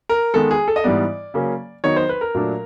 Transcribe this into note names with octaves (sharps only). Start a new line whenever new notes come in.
A#4
D#3 G#3 B3 A4
G#4
A4
D#5
G#2 E3 G3 B3 D5
C#3 F#3 A#3 C#4
D#3 F#3 B3 D#4 C#5
C5
B4
A#4
A#2 F#3 A3 D4